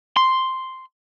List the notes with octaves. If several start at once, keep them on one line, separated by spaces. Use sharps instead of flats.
C6